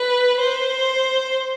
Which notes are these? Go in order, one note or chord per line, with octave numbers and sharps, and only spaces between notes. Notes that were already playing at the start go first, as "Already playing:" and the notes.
Already playing: B4
C5